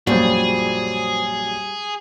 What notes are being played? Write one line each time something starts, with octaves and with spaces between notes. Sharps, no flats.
A#1 F#2 A#2 G3 F#4 G#4 C5